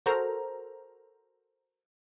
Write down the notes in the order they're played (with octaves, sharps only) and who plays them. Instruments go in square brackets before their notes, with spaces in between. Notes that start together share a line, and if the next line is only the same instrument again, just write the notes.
[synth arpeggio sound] F#4 A4 A#4 C5 A#5